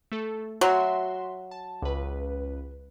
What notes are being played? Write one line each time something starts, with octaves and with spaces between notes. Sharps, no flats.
A3 A4
F#3 F#4 E5 C6
A5
C#2 B4